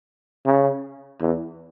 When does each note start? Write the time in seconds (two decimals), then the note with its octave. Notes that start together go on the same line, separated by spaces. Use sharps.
0.45 C#3
1.21 E2